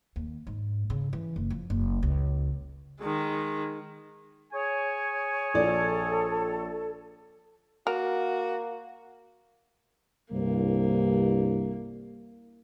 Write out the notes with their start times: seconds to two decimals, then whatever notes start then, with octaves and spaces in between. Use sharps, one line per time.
0.16 D#2
0.47 G#2
0.90 C#3
1.13 E3
1.36 F#1
1.50 F3
1.70 F#1
2.03 C#2
3.00 D#3 G#3
4.52 G#4 C#5 G#5
5.54 A#1 A4 D5
7.87 A#3 F#4 A#4
10.32 C2 G2 A#3